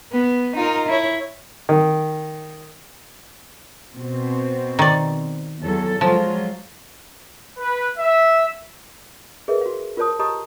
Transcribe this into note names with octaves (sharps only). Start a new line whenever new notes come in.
B3
D#4 F4 A#4
E4 C#5
D#3
B2 C4
D#3 D5
E2 F#3 A4
F3 F#3 G#3 F4
B4
E5
G#4 A#4 B4 D#5 E5
F#4 F5
F4 A#4 C5 C#5 A5 D#6
G4 C#5 D#5 A5 A#5 D#6